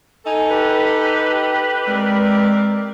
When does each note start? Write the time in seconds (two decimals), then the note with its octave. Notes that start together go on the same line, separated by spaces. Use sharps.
0.26 D#4 A4 G#5
0.49 G4 B4
1.87 G#3 C4 A#4 D5